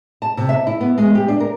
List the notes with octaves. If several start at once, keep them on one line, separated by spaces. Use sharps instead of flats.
A5
C3
E5
E4
B3
G#3
G4
D4
A#4